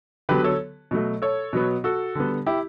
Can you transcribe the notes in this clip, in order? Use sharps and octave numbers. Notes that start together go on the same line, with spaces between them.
D3 F#3 B3 G4 B4
A4 C#5
B2 F#3 A3
A4 C#5
B2 F#3 B3
F#4 A4
D3 G3 B3
E4 G4